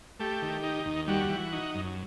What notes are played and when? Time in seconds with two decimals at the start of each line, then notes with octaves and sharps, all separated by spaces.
0.20 A3 G4
0.42 D#3
0.63 D#4
0.86 D#2
1.07 G3 F#4
1.30 E3
1.53 D#4
1.75 F#2